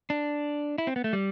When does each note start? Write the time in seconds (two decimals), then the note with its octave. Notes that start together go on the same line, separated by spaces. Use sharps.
0.10 D4
0.78 E4
0.87 C4
0.96 B3
1.04 A3
1.13 G3